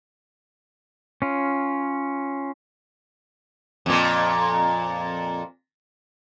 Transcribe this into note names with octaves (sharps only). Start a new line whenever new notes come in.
C#4 F4
F2 A#2